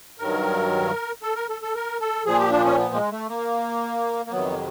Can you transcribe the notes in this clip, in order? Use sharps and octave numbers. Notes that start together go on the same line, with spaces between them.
G2 D#3 F#3 A#4
A4
A#4
A4
A4
A#4
A4
A#2 F3 G#4
G4
D4
C#4
B3
G#3
A3
A#3
A#3
F2 C3 D#3 F#3 B3